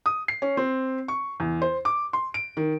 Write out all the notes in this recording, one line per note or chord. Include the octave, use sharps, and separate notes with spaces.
D#6
C7
C#4
C4
C#6
E2
C5
D6
C6
D7
D#3